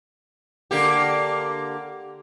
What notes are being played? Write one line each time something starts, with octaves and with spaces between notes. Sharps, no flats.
D3 A#3 G4